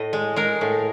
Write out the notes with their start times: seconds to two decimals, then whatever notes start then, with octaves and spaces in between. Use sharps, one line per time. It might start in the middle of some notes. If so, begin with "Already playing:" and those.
Already playing: A2 D#5
0.13 G#3
0.36 G#3 A#4
0.61 A2